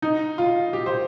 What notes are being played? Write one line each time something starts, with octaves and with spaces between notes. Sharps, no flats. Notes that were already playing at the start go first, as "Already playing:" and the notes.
D#4
F4
G4
C5